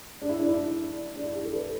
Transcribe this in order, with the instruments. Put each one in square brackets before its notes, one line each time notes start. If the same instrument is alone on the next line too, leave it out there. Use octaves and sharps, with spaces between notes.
[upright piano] D4
E4
D4
E4
D4
E4
G4
A4
B4